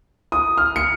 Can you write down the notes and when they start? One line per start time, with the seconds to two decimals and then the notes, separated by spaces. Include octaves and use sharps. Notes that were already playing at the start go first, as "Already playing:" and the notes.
0.32 D#6
0.57 F6
0.76 C#7